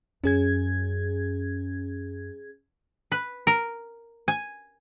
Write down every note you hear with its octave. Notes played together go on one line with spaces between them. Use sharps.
F#2 C#4 G#4 G#6
B4
A#4
G#5